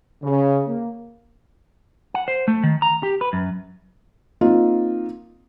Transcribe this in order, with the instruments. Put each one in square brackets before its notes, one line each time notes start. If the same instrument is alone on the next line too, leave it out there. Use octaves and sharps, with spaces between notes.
[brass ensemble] C#3
A#3
[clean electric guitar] F#5
C5
A3
D#3
A#5
G4
B4
F#2
[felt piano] A#3 C4 D#4 F4